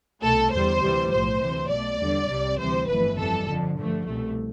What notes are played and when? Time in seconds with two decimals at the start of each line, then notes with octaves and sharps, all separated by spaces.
0.22 C2 B2 A3 A4
0.52 E2 D3 G3 C5
0.81 D2 C3 E3 G3
1.11 B1 A2 F3 C5
1.40 D2 C3 E3
1.69 B1 B2 A3 D5
1.99 E2 D3 G3
2.29 C2 C3 G3
2.59 D2 C3 E3 G3 C5
2.88 G1 F2 E3 A3 B4
3.18 F2 E3 G3 A4
3.47 F2 D3 F3
3.77 G2 D3 F3 A3
4.06 C2 B2 A3